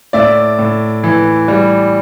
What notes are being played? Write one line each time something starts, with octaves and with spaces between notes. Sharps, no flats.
A2 D5 E5
A2
E3
G3